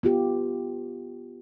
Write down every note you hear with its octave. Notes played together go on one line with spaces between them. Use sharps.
B3 F4 G4